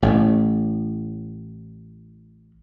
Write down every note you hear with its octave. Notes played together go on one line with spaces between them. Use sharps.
A1 A2